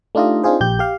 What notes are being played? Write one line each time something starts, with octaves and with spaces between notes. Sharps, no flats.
A3 D4 D#4 F4 G4 D#5
C4 D4 D#4 F4 G#4 C5
A#1 G4 G6
G4 F5